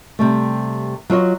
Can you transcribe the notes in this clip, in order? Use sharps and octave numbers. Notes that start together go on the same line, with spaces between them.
C3 G3 A3
F#3 F4 C#5 D#5